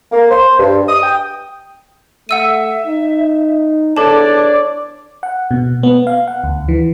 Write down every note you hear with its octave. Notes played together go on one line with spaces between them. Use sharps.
A#3
C5
G2
D#6
G5
A3 E5 F#5 E6 D#7
D#4
E2 D4 A4 C#5 D5 A5 D6
F#5
B2
B3
F5
F#5
D2
E3